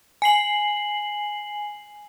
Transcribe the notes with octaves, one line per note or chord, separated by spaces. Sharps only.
G#5 C7 F#7